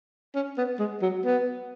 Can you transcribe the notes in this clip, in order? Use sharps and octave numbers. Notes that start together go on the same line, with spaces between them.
C#4
B3
G#3
F#3
B3